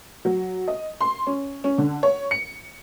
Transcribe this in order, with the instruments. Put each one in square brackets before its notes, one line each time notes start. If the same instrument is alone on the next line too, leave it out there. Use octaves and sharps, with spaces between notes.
[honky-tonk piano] F#3
D#5
C6
C#4
C#4
D3
C#5
C#7